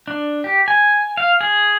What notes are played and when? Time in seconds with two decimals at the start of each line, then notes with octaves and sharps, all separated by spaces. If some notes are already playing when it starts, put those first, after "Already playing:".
0.07 D4
0.44 G4
0.68 G#5
1.17 F5
1.41 G#4